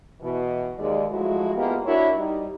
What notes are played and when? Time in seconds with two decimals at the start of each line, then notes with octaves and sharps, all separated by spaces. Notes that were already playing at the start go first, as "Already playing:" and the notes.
0.21 B2 E3
0.78 D#2 G#3 D5
1.11 F3 F#3 G#3 A3 E4 F#4
1.56 G#3 A#3 B3 E4 F4 G4
1.85 D4 E4 F#4 A#4 C#5
2.17 G3 D#4